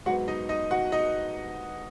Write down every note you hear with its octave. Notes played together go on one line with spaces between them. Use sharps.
G#2 F#3 B3 F#4 F#5
D#4 D#5
D#4 D#5
F#4 F#5
D#4 D#5